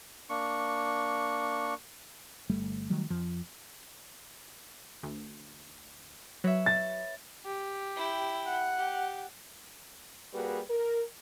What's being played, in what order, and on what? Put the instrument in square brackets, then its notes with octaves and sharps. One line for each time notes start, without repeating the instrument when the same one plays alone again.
[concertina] A#3 D4 C#6
[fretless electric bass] G1 G3 A3
D#3 F#3 G3 A3
F2 F3
[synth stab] D2
[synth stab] F#3 [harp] B4 C#5 E5
[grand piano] A6
[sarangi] G4
[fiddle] E4 G5
[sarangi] F#5
[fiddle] G4
[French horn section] G3 A#3 F#4 G#4 B4
A#4